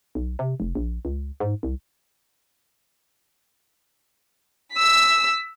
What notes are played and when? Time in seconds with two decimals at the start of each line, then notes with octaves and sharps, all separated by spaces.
0.15 B1
0.39 C3
0.60 F1
0.75 A#1
1.05 C#2
1.40 G#2
1.63 C2
4.73 E6 B6